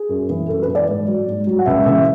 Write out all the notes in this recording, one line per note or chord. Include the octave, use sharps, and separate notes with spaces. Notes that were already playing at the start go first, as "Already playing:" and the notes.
Already playing: G#4
F#2
E3
F#2 A4
B4
E3
D5
G#2
F#3
G#2
F#3
F#5
C#2 E5
C#3 E3 E5